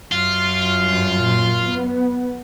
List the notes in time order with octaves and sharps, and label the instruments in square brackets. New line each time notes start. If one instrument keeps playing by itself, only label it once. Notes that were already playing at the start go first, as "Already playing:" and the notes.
[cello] F#2 [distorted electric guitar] F4
[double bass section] G2
A#2
B3